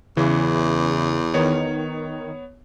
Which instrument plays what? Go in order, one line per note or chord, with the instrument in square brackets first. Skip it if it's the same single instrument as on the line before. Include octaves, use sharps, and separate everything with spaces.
[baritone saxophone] E2 [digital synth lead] C#3 [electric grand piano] E3
[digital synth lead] D#3 [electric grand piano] B3 C#5